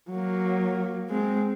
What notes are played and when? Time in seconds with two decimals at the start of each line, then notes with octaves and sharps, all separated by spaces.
0.10 F#3 A#3
1.10 G#3 C4